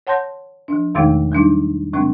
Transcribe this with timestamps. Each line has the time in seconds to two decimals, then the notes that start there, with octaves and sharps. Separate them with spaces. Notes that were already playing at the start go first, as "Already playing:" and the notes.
0.07 C#5 F#5 A5 C6 G6 A#6
0.68 F3 D4
0.95 E2 B2 D#3 G#3 A3 D#4
1.32 F#3 G3 D4 D#4
1.93 C3 F#3 G#3 C4 D4